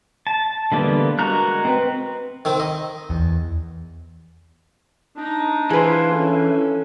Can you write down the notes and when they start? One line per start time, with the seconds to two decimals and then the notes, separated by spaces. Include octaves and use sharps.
0.27 A5
0.72 D3 E3 G3 A#3 B3
1.19 G#3 F#4 A#4 A#5 F#6
1.65 C4 B4
2.45 D#3 C4
2.60 D#5
3.10 E2
5.17 D4 D#4 A#5
5.70 E3 F4 G#4 B4 C5
6.12 C#4 A4